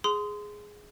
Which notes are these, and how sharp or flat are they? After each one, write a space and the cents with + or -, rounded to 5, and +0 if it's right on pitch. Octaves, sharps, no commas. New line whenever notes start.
G#4 +0 C6 -25 D#6 +5